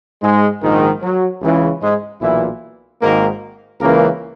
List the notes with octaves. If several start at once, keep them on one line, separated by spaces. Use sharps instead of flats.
G#2 G#3
A#1 G#2 D#3
F#3
C#2 C#3 E3
G#2 G#3
B1 A#2 E3 E4
G#1 G#2 D#3 A#3 A#4
C#2 C#3 E3 A#3 A#4